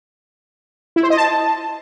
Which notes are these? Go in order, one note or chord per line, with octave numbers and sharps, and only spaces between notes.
E4
C5
D#5
A5